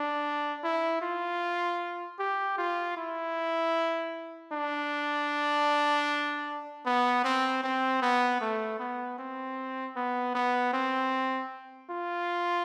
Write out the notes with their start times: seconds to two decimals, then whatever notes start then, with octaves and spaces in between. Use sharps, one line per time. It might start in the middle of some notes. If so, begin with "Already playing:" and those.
Already playing: D4
0.64 E4
1.02 F4
2.19 G4
2.58 F4
2.97 E4
4.52 D4
6.86 B3
7.24 C4
7.63 C4
8.02 B3
8.41 A3
8.79 B3
9.18 C4
9.96 B3
10.35 B3
10.73 C4
11.90 F4